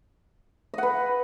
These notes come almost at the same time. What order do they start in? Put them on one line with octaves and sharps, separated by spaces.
D#5 F#5 B4